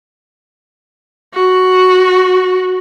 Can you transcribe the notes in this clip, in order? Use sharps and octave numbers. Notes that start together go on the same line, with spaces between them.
F#4